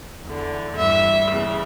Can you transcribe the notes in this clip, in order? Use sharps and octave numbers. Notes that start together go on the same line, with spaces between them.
E2 D3
G2 E3 E5
E2 C#3 E3